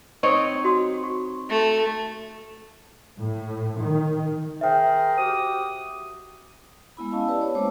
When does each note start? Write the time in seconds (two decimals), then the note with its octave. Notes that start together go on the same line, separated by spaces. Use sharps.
0.23 C4 D#4 C#5 C#6 D#6
0.64 F#4 C6 D#6
1.03 C#6
1.50 A3
3.18 A2
3.79 D#3
4.61 G#4 A#4 C5 E5 G5
5.17 F#4 G4 D#6
6.97 G#3 B3 E4 B5
7.11 C#4 E4 D#5 F5 A5 E6
7.27 G4 B4 D5 A5
7.42 C#5
7.55 G#3 A#3 E4 C5 A5 D6